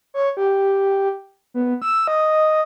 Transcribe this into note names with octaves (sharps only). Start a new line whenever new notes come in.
C#5
G4
B3
E6
D#5